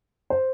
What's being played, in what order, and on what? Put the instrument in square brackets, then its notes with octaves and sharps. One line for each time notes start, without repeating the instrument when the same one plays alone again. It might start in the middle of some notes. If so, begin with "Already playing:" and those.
[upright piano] C5